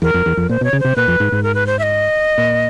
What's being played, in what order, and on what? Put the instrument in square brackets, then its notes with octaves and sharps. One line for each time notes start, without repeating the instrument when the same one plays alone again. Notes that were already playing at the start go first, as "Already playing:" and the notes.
[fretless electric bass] E2 [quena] A#4
[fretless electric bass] F2
E2
F2
[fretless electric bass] A#2 [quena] C5
[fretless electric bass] B2 [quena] C#5
[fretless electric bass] C#3
[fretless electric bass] C3 [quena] C5
[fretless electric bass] A#2 [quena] B4
[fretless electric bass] F2
G#2
G#2
[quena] A#4
B4
C5
E5
D#5
[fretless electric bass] A#2